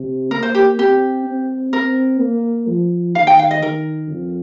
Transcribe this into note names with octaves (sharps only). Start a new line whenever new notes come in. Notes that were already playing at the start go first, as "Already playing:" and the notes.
Already playing: C3
A#3 A#4
C5
G4
C4 G4
C4
C4 A#4
A#3
F3
D#3 F5
G5
F5
D#5
D#3 A#4
F2